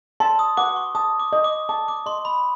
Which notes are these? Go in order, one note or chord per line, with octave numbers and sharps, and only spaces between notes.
A5 C6
D#6
F#5 D6
C#6
A5 D#6
D6
D#5
D6
A5 D6
D6
D#5 C6
B5